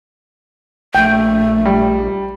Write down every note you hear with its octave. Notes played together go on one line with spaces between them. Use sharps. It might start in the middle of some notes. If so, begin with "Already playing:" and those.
A#1 A3 G5
G3